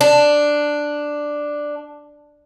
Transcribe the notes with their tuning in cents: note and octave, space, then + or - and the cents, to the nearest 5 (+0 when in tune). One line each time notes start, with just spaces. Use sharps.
D4 +5